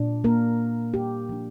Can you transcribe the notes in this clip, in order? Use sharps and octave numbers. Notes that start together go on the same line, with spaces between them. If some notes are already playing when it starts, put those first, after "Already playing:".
Already playing: A#2 D4
A#3 A#4
G4
F3 D4